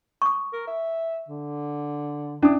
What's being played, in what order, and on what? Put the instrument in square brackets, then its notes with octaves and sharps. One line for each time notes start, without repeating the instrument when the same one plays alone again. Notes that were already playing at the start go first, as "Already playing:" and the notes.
[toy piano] C#6 D#6
[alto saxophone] A#4
E5
D3
[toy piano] C#4 D#6 [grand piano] D4 [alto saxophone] E4